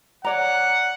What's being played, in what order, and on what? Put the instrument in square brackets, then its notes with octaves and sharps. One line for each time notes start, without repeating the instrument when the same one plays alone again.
[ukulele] C#5 D5 A#5 [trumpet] F#5